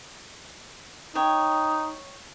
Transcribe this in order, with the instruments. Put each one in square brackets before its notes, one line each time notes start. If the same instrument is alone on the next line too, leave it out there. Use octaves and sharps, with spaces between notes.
[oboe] D#4 [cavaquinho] C#5 G5